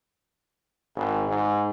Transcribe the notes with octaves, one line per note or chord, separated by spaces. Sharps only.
G#1
G#2